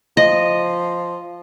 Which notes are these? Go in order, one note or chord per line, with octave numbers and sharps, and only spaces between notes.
F3 D#5